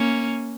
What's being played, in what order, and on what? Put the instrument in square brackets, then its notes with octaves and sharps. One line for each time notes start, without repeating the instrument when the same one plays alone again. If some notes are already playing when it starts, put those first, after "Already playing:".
Already playing: [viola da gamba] A#3 C#4